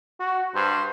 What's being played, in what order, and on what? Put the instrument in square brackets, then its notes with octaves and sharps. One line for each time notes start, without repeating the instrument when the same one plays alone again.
[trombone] F#4
[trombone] G2 [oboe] C5